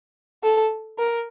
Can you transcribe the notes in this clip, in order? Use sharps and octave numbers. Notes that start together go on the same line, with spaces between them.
A4
A#4